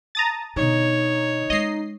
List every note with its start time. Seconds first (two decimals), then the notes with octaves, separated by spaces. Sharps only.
0.15 A5 A#5 D#6 A6
0.56 B2 D3 D#4 C#5
1.50 G#3 C#4 D#5 C7